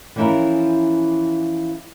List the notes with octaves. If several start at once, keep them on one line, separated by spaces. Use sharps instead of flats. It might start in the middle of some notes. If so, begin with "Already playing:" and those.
E3 F3 C#4 E4 A#4